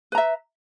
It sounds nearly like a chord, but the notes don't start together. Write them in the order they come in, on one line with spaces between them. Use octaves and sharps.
B4 A#5 E5